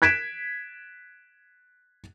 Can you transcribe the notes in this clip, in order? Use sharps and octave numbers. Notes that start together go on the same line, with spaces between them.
F#6 G#6 B6 D7 E7